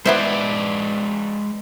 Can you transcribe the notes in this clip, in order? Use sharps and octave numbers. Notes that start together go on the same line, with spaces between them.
G#3 B3 E4 B4 C5 D5